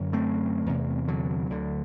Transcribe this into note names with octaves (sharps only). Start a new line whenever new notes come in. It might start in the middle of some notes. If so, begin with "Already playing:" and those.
Already playing: F#2 D3
A3 C4
E2 C3
D3 F#3
D2 D3